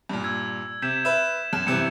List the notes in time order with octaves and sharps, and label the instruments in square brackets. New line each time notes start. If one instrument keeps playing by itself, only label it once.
[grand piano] G2 A#2
[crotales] E6 G#6
[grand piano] C3 [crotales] G6 B6 E7
[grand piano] B4 E5 [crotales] E7
[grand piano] F#2 E7
[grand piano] G2 C3 E3 [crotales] C#7